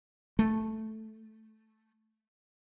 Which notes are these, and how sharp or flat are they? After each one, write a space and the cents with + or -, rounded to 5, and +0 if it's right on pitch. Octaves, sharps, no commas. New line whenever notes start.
A3 -5